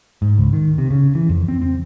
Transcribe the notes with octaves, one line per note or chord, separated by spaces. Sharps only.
G#2
C#2
D#3
C3
C#3
E3
F2
C4
C4